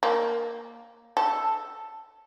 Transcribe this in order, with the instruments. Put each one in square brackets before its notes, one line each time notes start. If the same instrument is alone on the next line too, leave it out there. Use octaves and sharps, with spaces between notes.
[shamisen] A#3
A4